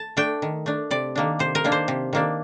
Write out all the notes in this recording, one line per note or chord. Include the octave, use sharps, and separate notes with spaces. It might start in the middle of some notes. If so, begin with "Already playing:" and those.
Already playing: A5
A3 D4 G5
D#3
A3 D4
C3 D5
D#3 A#3 D4
C3 C5
A#4
D#3 A#3 D4
C5
C3
D#3 A#3 D4